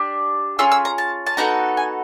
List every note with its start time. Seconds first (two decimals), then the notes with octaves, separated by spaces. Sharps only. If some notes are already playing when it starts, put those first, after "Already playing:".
Already playing: D4 G4
0.59 C#4 F4 G#4 E6
0.72 E6
0.85 A#5
0.98 A5
1.26 A5
1.37 B3 D#4 F#4 A4 A#5
1.77 G#5